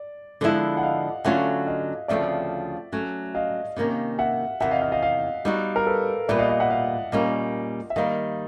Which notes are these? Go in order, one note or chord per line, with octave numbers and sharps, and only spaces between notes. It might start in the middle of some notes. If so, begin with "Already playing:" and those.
Already playing: D5
D3 F3 G#3 B3 E4
F#5
D#5 F5
D3 F#3 A3 C#4 F4 E5 F#5
D#5 F5
D2 C#3 F3 A3 C4 D5 E5
F#3 A3 C#4
D#5 F5
C3 D#3 G3 A#3 C#4
E5 F#5
E2 C3 D#3 E5 F#5
D#5 F5
D#5 F5
D#5 F5
D#5 F5
G3 B3 D#4 F#4
A#4
A4 B4
A#2 G3 B3 D5 E5
D#5 F5
D#5 F5
E5 F#5
D#5 F5
A#2 G3 A#3 C#4 D#5 F5
E5
D#3 G3 A#3 D#5 F5